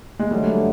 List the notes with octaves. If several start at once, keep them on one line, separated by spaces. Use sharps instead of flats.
G#3
G2 D3 F#3 G3 A3